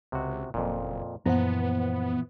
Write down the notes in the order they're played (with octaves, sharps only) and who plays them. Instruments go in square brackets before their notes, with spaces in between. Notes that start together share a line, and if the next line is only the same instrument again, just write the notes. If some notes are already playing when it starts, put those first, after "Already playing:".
[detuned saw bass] C#2 [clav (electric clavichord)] C3 F#4
[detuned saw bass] F#1 [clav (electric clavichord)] F2 A#2
[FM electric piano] F#2 C5 F#5 [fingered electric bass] A#2 E3 F3 [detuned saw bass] B3 [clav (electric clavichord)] A#5